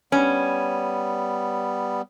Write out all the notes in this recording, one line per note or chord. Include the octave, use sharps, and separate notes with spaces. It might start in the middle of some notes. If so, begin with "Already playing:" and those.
G3 B3 C#4